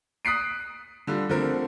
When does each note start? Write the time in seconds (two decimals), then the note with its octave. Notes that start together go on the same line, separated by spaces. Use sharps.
0.25 D#6 F#6 B6 C7 D7
1.07 D3 G3 F4
1.29 D3 F3 A3 C4 A#4